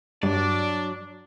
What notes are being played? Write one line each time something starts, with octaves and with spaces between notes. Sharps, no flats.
G2 F#3 D4 D5